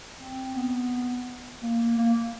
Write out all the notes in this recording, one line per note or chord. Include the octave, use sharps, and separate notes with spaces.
C4
B3
A#3
A#3